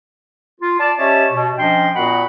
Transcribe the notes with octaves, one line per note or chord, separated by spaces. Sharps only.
F4
D5 A5
C#4 G4 C#5 D#5 E5 A5
B2
F3 C#4 D4 D#5 G5 C6
A#2 B3 F#4 A#4 F#5 B5